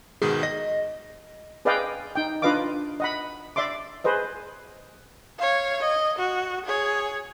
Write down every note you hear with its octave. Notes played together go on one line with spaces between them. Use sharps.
G#2 B2 D#3 G#4
D#5 A#6
G#4 B4 D5 D#5 F5 G5
D#4 G5
D4 F4 B4 D#5 F5 D6
D#5 F#5 B5
D5 E5 C6 D6
G#4 B4 C5 D#5
C#5 F5
D#5
F#4
G#4 C#5